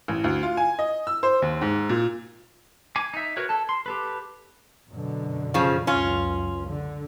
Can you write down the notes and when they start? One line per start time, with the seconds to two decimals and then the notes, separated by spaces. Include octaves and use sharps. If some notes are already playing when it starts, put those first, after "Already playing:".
0.08 A1
0.24 D2
0.43 F4
0.57 G#5
0.79 D#5
1.07 E6
1.23 C5
1.42 D#2
1.61 G#2
1.89 A#2
2.96 G#5 D6
3.14 D#4 E5
3.37 F#4 A#4 B4 C#5
3.49 A4 A5
3.69 C6
3.86 G4 A4 B4
4.90 F#2 B2 D3
5.54 C#3 F3
5.87 C#2 F#2 C#4 F4
6.67 D3